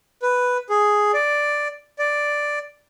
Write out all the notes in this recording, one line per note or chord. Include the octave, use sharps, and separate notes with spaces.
B4
G#4
D5
D5